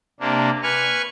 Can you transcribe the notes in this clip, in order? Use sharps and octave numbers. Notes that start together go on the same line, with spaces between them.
C3 A#3 D4
B4 G#5 C#6 F6